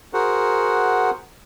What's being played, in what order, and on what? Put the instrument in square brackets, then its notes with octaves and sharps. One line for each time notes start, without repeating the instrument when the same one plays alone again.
[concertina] F#4 G#4 A#4 C5 F#5